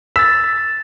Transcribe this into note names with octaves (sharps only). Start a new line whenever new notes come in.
E6 A6 B6